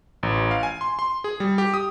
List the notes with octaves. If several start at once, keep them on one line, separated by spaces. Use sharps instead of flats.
A1
F5
G#5
C6
C6
G#4
G3
G4
D#6